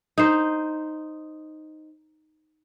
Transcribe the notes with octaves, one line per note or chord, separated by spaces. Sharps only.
D#4 C5